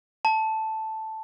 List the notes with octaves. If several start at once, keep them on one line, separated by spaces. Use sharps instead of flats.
A5